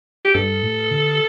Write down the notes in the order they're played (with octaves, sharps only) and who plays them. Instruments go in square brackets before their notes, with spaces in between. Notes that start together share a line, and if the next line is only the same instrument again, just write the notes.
[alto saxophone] G4
[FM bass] G2 [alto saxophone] A4
[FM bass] A2
D3